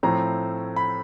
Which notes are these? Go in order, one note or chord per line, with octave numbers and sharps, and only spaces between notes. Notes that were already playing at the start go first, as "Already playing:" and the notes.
A2 F3 A3 C4 A#5
B5